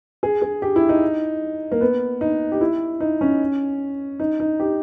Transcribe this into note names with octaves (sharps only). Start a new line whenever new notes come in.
G#4
G#4
G4
E4
D#4
A#3
B3
D#4
G4
E4
D#4
C#4
D#4
D#4
G4